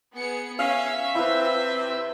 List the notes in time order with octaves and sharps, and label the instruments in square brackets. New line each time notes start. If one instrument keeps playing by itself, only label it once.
[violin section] B3 G#4 C#7
[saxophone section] C#4 [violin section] E5 B6 [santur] F5
[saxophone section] C3 C4 [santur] E4 B4